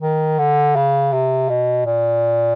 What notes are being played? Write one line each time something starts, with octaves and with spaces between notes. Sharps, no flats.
D#3
D3
C#3
C3
B2
A#2